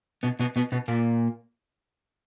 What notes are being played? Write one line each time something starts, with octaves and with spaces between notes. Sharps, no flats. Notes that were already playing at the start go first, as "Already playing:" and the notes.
B2 B3
B2 B3
B2 B3
B2 B3
A#2 A#3